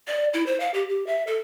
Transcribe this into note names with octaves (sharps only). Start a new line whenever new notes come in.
D5
E4
C5
F5
G4
G4
E5
A4